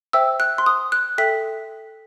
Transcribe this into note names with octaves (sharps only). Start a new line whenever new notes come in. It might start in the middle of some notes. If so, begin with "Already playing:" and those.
C5 E5 G5 E6
F#6
C6
D#6
F#6
A4 E5 G5 B6